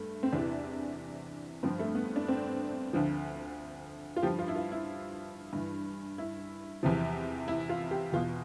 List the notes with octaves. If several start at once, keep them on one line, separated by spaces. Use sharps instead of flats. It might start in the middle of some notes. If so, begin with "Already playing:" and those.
Already playing: G2 A3
C4
E2 C3 E3 D4
G2 F3 C4
A3
B3
D4
C4
D2 D3 F3
F4
G2 F3 G4
F4
E4
F4
E4
G2 E3
E4
E2 C3 F3
E4
F4
G4
E2 B2 F4